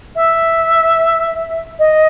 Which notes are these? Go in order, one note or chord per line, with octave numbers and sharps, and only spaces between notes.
E5
D#5